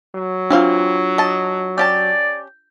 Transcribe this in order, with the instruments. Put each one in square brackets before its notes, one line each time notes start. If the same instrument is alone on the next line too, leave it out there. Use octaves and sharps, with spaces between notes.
[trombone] F#3
[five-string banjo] E3 C4 F5 [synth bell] D4 F4
[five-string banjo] D#5 A5
[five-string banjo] C#4 G4 A5 [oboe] D5 [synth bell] G6